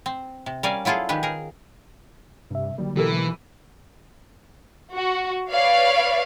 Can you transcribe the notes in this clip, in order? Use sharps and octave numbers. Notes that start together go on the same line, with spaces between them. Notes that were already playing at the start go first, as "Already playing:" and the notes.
C4
C3
G3 C#4 A#4 D5 F5 G#5
F#3 E4 F4 G#4 A4
D#3 G#3 G4 B4
G#4 A#4
G2 C3 E5
D3 F#3 G3 A#3
B2 E3 G4 A4 A#4
F#4
B4 C#5 D5 F5